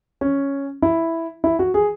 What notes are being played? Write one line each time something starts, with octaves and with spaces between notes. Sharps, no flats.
C#4
E4
E4
F#4
G#4